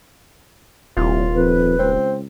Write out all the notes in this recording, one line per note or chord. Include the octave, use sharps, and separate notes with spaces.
D#1 C2 F4
F2 B4
C#2 C4